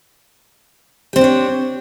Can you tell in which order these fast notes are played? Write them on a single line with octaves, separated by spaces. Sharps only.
G4 C4 D5 D4 C#5